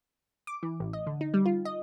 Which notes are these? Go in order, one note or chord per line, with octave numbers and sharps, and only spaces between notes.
D6
E3
A1
D#5
D3
D#4
G3
F4
D#5